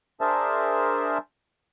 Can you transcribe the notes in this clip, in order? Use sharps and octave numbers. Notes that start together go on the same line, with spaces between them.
D4 G#4 A#4 C5 E5 A5